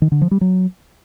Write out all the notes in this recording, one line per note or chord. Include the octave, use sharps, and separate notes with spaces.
D#3
D3
F3
G3
F#3